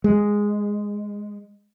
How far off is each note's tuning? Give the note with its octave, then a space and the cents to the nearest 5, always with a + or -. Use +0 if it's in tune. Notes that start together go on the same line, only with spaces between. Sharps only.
G#3 -5